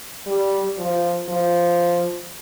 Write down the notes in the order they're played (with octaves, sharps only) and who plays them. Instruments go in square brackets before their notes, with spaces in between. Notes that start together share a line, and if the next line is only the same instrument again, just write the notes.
[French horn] G3
F3
F3